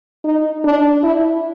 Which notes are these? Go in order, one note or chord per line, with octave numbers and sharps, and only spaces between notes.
D#4
D4
E4